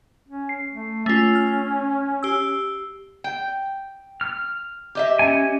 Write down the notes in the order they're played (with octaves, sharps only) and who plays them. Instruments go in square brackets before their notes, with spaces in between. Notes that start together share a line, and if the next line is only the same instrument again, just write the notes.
[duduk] C#4
[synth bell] C7
[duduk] A3
[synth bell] A3 F4 [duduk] C#4
[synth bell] F6
G4 E6
[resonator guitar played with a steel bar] G5
[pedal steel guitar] F6
[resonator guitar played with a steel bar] G4 D#5 E5
[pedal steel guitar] C#4 G#5